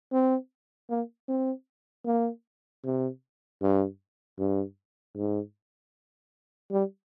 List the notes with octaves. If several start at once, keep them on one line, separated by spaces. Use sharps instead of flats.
C4
A#3
C4
A#3
C3
G2
G2
G#2
G3